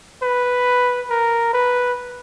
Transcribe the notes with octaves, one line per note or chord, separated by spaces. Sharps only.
B4
A#4
B4